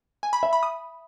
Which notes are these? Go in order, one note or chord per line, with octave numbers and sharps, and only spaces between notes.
G#5
B5
E5
B5
D#6